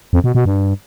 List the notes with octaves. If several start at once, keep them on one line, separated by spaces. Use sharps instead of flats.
F2
B2
B2
G2